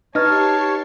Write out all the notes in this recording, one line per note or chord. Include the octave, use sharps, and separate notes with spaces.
D#4 G4 B4 C#5 A5 C#6 F6 C7